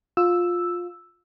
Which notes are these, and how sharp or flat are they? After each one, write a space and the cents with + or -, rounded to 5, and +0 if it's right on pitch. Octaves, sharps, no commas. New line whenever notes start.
F4 +15 E6 +0